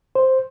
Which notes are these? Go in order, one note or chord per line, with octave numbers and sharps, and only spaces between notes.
C5